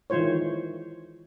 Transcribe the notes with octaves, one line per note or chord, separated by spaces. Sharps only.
D#3 E3 G#3 F4 C5 C#5